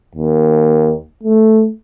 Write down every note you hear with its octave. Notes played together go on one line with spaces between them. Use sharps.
D#2
A3